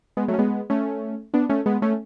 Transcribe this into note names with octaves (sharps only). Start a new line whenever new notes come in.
G#3 B3
F#3 A3
C#4
G#3 B3
A3 C#4
B3 D4
A3 C#4
G#3 B3
A3 C#4